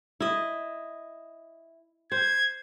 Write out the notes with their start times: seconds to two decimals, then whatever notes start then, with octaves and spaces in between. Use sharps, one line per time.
0.20 E4 D#5
2.12 C5 G#6